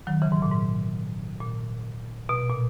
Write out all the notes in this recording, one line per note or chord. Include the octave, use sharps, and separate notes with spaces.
D#3 F#3
C#3 E3
G#2
A#2
G#2
A#2
B2
A#2